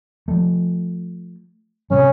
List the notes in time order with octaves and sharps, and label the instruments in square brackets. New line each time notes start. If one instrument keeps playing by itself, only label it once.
[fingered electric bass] F3 A3
[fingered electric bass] A2 C3 G3 [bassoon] C#4